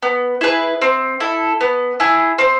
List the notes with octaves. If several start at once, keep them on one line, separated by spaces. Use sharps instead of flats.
B3
E4 G#4 B4
C4
E4 A4
B3
E4 G#4
C4